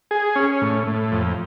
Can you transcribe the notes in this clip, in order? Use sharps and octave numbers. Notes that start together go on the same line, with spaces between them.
G#4
C#4
A2
A2
F2